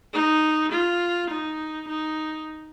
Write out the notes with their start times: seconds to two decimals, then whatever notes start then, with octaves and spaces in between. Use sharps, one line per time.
0.14 D#4
0.72 F4
1.30 D#4
1.88 D#4